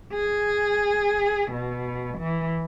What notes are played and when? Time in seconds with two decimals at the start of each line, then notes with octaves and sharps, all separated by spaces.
0.14 G#4
1.52 B2
2.18 E3